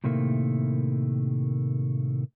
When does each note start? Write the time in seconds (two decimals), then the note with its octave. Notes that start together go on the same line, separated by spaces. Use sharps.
0.04 A2 C3 D#3 A3 A#3